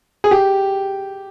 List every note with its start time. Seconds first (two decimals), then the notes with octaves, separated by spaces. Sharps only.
0.24 G#4
0.31 G4